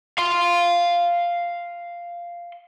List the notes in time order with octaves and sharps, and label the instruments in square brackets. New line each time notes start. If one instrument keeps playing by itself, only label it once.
[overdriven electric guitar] F5 C6